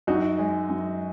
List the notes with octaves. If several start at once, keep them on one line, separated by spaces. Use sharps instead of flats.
F#2 D#4 F#4
G#3
F#2